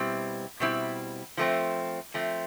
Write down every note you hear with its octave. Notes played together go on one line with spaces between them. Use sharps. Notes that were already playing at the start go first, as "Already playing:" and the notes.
Already playing: B2 G3 C4 E4
B2 G3 C4 E4
F3 A3 C4
F3 A3 C4